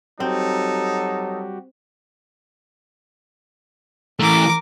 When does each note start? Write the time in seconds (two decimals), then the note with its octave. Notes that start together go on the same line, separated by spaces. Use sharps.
0.20 F#3 G3 C4 D#4 F#4 G4 A4
4.20 E3 A3 A#4 D6